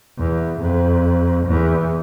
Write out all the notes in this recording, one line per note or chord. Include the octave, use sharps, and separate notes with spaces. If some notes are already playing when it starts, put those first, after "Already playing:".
E2
F2
E2